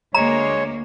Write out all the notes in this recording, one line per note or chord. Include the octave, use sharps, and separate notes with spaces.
D2 G#3 A#3 C#5 A#5